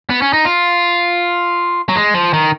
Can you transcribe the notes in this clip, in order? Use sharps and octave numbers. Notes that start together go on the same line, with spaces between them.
B3
C#4
D#4
F4
F#3
G#3
F3
D#3